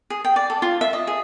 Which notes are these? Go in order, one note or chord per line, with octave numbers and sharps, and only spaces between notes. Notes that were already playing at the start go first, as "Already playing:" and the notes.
G#4
G5
D5
A4
F4
E5
D#5
G#4